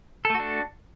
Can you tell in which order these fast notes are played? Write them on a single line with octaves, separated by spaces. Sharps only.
A4 A3 F#4 D4